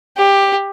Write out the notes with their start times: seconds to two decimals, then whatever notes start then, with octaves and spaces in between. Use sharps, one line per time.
0.17 G4